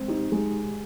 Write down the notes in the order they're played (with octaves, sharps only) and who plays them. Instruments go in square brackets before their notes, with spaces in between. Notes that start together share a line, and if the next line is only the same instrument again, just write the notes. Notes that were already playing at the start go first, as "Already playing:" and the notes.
Already playing: [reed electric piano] G#3 [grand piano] C4
[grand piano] D#4 [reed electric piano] G4
[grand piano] G#3